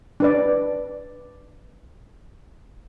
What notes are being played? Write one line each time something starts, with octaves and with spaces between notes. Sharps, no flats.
D4 B4 D5